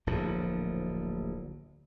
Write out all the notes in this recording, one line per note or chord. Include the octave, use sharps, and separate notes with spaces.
D1 A#1 A2 F3